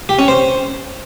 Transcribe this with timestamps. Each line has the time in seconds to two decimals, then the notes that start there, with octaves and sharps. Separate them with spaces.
0.09 G4
0.19 C#4
0.28 C5